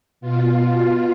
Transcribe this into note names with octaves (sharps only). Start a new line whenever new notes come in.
B2 F4